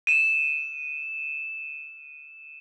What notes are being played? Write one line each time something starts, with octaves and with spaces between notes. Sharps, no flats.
D#7 E7